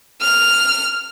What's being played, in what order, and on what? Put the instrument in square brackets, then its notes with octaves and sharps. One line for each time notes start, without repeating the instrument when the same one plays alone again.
[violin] F6